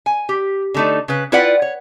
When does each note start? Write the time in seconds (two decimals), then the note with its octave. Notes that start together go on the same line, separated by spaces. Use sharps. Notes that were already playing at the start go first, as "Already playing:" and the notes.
0.06 G#5
0.29 G4
0.74 D3 A3 D#4
1.08 C#3 B4
1.32 E4 F4 B4 D5 F#5 G5
1.62 C#5